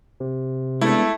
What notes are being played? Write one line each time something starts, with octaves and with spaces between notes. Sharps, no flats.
C3
G#3 A3 B3 D4 E4